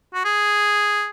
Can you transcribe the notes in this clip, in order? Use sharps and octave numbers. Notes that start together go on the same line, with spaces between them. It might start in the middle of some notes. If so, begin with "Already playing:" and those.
F#4
G#4